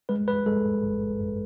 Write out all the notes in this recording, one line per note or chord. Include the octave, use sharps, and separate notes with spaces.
G#3 B4
B4
G#3 A4
G#1
F#2